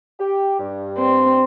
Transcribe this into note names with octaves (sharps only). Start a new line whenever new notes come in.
G4
G2
C4